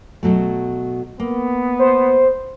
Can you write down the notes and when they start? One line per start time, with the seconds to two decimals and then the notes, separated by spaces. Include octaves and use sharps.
0.23 B2 F#3 A3
1.20 A#3 B3
1.79 C5